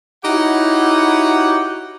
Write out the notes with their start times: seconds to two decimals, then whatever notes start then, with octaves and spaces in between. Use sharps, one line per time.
0.24 D#4 E4 F#4 G4 C#5 F#5